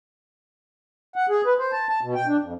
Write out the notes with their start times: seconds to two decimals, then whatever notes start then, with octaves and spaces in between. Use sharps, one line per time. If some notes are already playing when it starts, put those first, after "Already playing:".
1.16 F#5
1.29 G#4
1.46 B4
1.59 C5
1.72 A5
1.89 A5
2.02 B2
2.15 G5
2.27 D4
2.43 F2